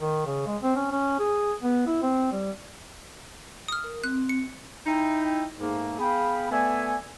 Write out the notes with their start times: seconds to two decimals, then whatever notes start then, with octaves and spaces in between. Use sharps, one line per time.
0.01 D#3
0.27 C#3
0.47 G#3
0.63 C4
0.76 C#4
0.91 C#4
1.19 G#4
1.63 B3
1.87 E4
2.02 C4
2.32 G3
3.68 D#6 F6
3.84 A#4
4.04 C4 F#6
4.29 C#7
4.86 D#4 E4 G5
5.60 G#2 A3 A#3
5.99 B3 G#4 F5 G5 B5
6.51 A3 B3 D5 E5 G#5